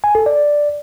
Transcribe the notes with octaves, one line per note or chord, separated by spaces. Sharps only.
G#5
A4
D5